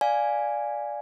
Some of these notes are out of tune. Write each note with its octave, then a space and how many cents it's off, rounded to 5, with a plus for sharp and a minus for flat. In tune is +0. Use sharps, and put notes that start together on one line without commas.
D5 +0 F5 +0 G#5 +0